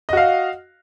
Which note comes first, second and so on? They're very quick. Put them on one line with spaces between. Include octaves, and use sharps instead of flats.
D#5 F#4 F5